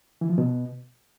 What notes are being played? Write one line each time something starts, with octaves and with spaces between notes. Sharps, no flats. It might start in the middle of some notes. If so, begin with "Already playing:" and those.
E3
F3
B2